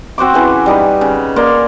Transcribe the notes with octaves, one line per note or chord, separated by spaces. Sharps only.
C4 F#4 C5 D6
C#3 E3
G3 D#4 B4
C#3
A#3 D5 C6